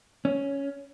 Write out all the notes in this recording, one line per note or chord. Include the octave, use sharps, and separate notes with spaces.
C#4